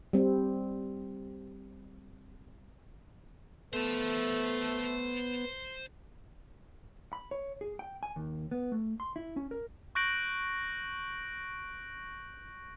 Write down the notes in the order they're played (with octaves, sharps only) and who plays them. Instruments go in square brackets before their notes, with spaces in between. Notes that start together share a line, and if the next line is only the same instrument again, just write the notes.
[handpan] G3 C4
[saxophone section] A3 [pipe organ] B3 [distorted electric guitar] C5 A5
[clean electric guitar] B5
C#5
G#4
G5
G#5
D#2
B3
A3
C6
E4
C#4
A#4
[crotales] C#6 F#6 G6 A#6 D7 F#7